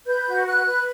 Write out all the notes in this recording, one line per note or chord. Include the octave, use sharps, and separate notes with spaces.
B4 G6
F#4
B4 F#6
B4